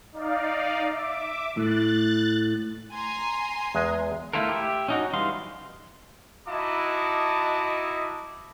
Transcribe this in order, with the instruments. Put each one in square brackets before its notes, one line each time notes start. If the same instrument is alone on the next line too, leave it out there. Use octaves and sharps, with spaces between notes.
[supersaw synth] D#4 D5 F5
E5 D6
[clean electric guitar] A2 [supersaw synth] F#6 A6
[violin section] G#5 A#5 C6
[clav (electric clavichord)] E2 G#3
[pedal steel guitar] A3 E4 F4 A4 A#4
G4 E5
C#4 D#4 F#4
E3 G3 D#4 F5 C6
[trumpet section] D#4 E4 F#4 D#5 A5 D6